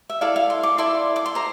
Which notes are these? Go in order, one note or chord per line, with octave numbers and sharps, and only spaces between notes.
E5
E4 A4 D5 F5
F5
C6
D6
E4 A4 D5 C6
D6
C6
C5 A#5